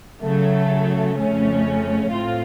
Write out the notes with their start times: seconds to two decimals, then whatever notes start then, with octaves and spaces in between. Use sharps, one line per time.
0.24 C#3 F#3 A3
1.17 F2 C#3 A3 C#4
2.11 A2 A3 C4 F4